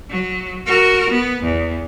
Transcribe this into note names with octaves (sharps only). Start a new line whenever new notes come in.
F#3
F#4 A#4
B3
E2